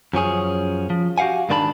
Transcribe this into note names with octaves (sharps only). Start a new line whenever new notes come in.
F#2 F3 C#4 G#4
F3
F#4 G4 F5 F#5 G#5
G#2 D#3 D4 B4 A5 B5